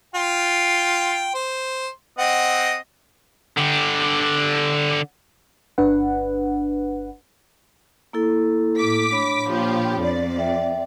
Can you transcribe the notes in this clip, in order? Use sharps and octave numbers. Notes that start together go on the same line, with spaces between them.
F4 G5
C5
C4 D#5 F#5
D3 G4
G1 D4 B4 F#5
A#3 E4 A4
A2 D6 B6
D4 C#5 B5
A#2 F3 G4
F2 D5
E5 G5